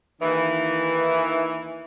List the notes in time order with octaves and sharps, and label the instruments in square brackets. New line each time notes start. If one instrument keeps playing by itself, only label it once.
[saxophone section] D#2 D#3 E3